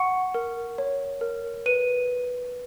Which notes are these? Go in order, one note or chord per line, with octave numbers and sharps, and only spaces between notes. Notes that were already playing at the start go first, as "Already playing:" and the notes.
Already playing: F#5 C#6 C#7
A#4
C#5
A#4
B4 D#7